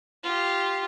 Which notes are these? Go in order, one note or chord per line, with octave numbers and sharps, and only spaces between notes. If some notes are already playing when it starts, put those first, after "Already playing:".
F4 G4